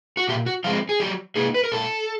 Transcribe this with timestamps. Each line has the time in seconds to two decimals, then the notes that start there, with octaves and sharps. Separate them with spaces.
0.17 F#4
0.29 A#2 G4
0.46 F#4
0.64 F3 G#3 C4 F4
0.89 G#4
1.00 F#3 G4
1.36 A#3 D#4 G#4
1.54 B4
1.64 A#4
1.72 A#2 A4